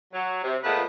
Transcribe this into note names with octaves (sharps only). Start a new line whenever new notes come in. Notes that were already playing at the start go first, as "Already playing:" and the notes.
F#3
C3
A#2 F3 G#3 A3 B3 B4